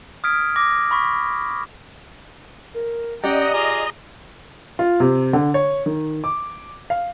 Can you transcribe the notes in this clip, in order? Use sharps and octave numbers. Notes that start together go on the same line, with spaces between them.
D#6 F6 G#6 B6 D7
D6 A#6
B5 C#6 B6
A#4
C#4 G4 D5 D#5 F#5 G5 A#5
F4 G#4 A#5 D6
F4
C3
D3
C#5
D#3
D6
F5